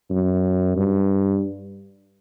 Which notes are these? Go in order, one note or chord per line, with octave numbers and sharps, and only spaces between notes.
F#2
G2